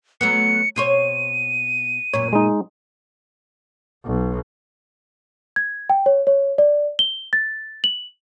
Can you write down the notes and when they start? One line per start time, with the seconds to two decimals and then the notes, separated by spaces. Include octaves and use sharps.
0.21 F#3 A3 B3 C#7
0.76 B2 C5 C#5 D#7
2.14 F#2 A#2 C#5
2.33 G#3 D#4
4.06 B1
5.56 G#6
5.90 G5
6.06 C#5
6.27 C#5
6.58 D5
6.99 G7
7.33 A6
7.84 F#7